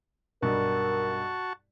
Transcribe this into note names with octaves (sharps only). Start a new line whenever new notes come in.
B1 G2 G3 F#4 A#4 A5 C#6